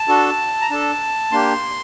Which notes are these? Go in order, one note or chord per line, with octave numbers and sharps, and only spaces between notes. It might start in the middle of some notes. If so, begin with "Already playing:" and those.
Already playing: A5
D4 F#4 A4
A#5
D4 A4 A5
A#3 D4 G4 C6